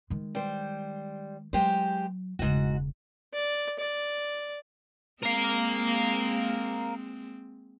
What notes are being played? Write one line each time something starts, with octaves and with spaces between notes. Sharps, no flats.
D#3 G#3
G3 C5
F#3 G#3 G4 C5
E1 G#2 C#3 F#4
D5
D5
G#3 A#3 C4 A#4 F5